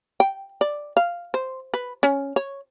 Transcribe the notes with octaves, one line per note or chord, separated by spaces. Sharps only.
G5
D5
F5
C5
B4
C#4
C#5